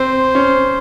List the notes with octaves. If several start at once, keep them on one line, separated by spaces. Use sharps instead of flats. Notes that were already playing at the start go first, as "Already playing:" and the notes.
Already playing: C4 C5
C#4